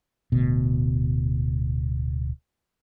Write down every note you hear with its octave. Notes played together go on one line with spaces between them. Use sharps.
D1 D2 B2